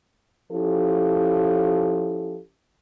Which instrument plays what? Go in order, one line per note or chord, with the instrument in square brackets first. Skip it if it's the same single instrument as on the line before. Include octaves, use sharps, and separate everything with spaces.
[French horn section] F3 C#4 E4 G4 A4